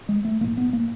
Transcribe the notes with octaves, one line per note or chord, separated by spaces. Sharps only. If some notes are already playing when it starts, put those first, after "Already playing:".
G#3
A3
A#1 G#2 A#3
B3
A#3